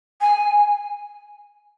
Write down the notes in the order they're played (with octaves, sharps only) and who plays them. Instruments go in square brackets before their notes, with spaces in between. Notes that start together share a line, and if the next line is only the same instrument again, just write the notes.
[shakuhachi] G#5